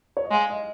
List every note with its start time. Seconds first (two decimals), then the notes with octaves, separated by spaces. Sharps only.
0.17 C#5
0.25 D#5
0.31 G#3 F5
0.50 D#5